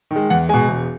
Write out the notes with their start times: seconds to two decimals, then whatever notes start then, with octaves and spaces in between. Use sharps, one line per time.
0.11 D#3
0.16 G#3
0.30 E2 F#5
0.49 B2 G#3 G#5
0.68 E1